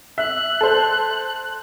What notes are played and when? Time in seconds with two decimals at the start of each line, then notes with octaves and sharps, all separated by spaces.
0.18 E5 F#6
0.61 A4 C5